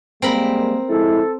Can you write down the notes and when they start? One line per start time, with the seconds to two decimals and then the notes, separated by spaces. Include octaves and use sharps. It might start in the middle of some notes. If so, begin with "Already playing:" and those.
0.22 G3 G#3 A#3 C4 A#4 B5
0.89 F3 G#3 E4 A4